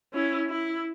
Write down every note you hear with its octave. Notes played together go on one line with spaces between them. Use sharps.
C#4 E4
E4